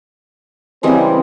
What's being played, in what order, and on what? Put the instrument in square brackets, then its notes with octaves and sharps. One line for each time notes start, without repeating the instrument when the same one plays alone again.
[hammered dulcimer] C#3 G#3 [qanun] E3 G3 A#4 [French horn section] C4